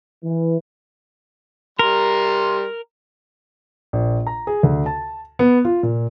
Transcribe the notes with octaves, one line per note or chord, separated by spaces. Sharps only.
E3
G3 A#4 C6
A#1
A#5
G#4
D2
A5
B3
F4
A#2